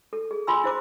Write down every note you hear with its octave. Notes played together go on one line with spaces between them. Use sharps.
A4
G#4
F4 G#5 B5 C6 E6
E4 C5 D6